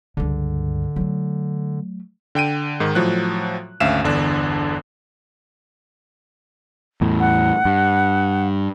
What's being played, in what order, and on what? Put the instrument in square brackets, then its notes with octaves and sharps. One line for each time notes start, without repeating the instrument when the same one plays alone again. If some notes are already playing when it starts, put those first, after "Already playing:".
[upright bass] C#2 G2 [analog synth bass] D3
[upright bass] F#3 A3
[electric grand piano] D3 G5 D7 D#7
G#2 D#3
A2 F3 F#3 F#6
G#1 D2 C#4 E5 F5 E7
G1 E2 D3 D4
[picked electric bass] E2 A2
[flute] F#5
[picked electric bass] G2